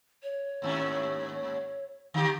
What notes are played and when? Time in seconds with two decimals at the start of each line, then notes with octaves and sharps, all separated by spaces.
0.23 C#5
0.62 D#2 G#2 C#4
2.14 D3 G4